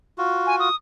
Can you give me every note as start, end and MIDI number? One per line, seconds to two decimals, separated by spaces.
0.18 0.69 65
0.18 0.69 66
0.47 0.55 80
0.60 0.75 87